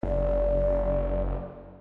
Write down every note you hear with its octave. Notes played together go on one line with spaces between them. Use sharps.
F#1 D5